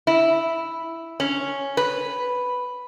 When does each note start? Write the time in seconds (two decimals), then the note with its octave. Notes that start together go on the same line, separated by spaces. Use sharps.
0.07 E4
1.20 C#4
1.77 B4